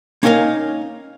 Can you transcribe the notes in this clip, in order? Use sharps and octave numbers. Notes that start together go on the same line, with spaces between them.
A#3 C#4 D#4 A#4 D#5 F5